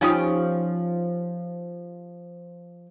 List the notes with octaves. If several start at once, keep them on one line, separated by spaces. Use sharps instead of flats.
F3 C#4 D#4 F4 G4 D#6